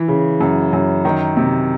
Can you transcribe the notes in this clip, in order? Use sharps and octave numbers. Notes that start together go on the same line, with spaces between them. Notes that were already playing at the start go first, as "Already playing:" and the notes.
Already playing: E3
C#3
F#2
F#2
D#3
C3